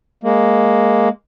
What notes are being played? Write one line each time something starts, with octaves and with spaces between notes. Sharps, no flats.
G#3 A#3